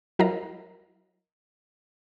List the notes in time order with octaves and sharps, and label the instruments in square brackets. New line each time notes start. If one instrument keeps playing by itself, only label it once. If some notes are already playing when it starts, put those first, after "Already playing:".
[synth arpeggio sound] F#3 E4 A#4 D#5 F5 A#5